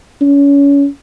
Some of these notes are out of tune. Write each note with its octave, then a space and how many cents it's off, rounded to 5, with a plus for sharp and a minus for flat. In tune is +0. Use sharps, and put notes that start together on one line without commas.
C#4 +30